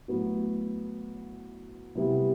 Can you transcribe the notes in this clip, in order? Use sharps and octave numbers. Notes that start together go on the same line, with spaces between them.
A2 F#3 B3
C3 G3 B3 E4